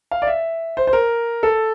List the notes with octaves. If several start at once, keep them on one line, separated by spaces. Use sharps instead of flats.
F5
D5
E5
C5
C5
A#4
A4